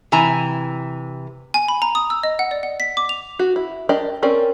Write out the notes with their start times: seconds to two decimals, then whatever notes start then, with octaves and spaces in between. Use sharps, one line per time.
0.12 C3 E3 G#5 A#5
1.54 G#5
1.68 B5
1.82 A#5
1.95 D#6
2.10 E6
2.23 D#5
2.39 F#5
2.51 D5
2.63 F#5
2.80 B6
2.97 D6
3.09 F7
3.39 F#4
3.56 E4
3.89 D4 G4 A#4 D5 D#5
4.23 C4 C#4 A#4 D5